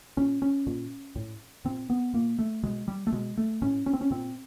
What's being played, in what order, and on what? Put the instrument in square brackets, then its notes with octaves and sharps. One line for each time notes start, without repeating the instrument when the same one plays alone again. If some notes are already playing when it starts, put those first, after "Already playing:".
[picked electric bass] A#2 C#4
C#4
A#2
A2
A#2 C4
B3
A#2 A#3
A3
B2 G#3
G3
A3
B2 G#3
A3
A2 C#4
C#4
C4
C#4
A#2 C4